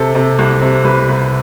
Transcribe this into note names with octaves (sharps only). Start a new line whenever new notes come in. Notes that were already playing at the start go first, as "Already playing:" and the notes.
Already playing: C3 A4
C3
C2
C3
C2 B4
C2